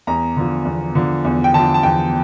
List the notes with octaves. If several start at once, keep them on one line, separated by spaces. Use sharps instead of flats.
E2 A#5
D3 F3
E2
D3 F3
E2
G5
D3 F3 A5
A5
E2 G5